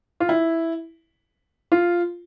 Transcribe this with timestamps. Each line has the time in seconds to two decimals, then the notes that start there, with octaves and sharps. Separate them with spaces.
0.20 F4
0.29 E4
1.72 F4